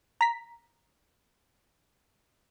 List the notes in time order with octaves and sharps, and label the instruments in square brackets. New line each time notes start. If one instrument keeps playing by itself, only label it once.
[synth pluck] A#5 B6